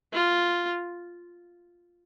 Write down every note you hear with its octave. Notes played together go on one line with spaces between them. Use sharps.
F4